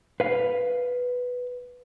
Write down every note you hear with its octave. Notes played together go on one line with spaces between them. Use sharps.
B4 F5